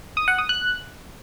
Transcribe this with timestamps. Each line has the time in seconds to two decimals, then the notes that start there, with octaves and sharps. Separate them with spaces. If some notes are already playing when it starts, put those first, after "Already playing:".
0.17 D#6
0.28 F#5
0.38 D#6
0.49 F#6